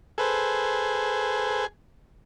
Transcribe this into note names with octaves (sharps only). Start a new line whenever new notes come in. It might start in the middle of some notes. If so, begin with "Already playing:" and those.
G#4 A4 B4 C5